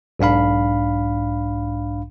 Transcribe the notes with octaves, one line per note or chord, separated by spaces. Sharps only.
B1 G#2 D4 F5 B5